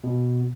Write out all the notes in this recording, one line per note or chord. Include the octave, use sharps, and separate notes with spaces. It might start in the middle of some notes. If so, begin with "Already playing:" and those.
B2